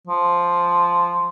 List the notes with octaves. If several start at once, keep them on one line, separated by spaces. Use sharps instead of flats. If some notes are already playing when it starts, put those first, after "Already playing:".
F3